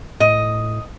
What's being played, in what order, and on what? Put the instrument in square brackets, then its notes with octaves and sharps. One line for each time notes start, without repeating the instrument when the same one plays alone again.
[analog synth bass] A2 [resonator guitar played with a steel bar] D#5